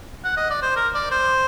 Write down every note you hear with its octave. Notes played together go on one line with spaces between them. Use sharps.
F#5
D#5
D5
C5
A#4
D5
C5